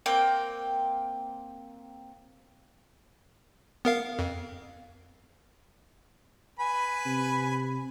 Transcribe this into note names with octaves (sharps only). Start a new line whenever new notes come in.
A#3 C4 G5
B3 A#4 F5
F2
B4 G#5 B5
C3